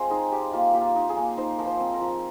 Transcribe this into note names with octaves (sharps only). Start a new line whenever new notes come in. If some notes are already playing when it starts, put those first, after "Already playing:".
Already playing: G#3 C4 F4 C5 F5
D#4 G#4
G#3 G4
A#3 F4
A#3 G4
F4
D#4
G#4
A#3
D#4 C5
F3 A#4
C5
C4
A#4
F3